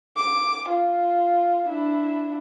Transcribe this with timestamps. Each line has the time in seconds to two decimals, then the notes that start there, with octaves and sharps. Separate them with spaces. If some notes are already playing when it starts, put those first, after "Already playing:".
0.17 D6
0.70 F4
1.68 D4 E4